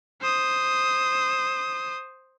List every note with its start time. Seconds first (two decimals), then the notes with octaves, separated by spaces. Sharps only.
0.22 C5 D#6